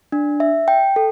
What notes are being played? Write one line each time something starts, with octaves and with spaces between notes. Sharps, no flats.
D4
E5
G5
A4